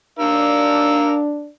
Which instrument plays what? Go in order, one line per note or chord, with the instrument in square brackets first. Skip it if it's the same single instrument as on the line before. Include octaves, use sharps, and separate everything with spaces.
[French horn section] D4 [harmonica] A#4 F5 E6